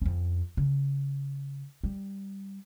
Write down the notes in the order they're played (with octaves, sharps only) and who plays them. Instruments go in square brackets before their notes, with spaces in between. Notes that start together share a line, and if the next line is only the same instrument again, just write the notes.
[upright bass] F2 C#4
C#3
G3